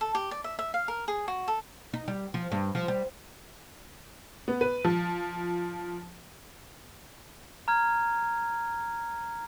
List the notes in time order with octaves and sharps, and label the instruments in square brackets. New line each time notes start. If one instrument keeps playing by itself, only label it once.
[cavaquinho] A4
G4
D5
E5
E5
F5
A#4
G#4
F#4
A4
[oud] D#4
G3
F3
G2
F3
G3
[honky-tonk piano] B3
B4
F3
[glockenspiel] A#5 F6 G#6